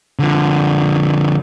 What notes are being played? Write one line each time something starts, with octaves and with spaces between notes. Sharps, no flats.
D3 F3